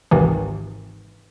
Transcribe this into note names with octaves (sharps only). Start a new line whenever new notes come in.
G#1 C#2 G#2 C3 D#3 E3